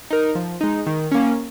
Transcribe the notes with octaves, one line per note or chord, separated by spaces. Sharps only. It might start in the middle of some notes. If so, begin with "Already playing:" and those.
D#4 A#4
F3
G#3 D#4
D#3
A#3 C#4